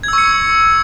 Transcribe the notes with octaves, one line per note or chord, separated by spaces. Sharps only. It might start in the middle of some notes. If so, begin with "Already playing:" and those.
C#6 E6 G#6 C#7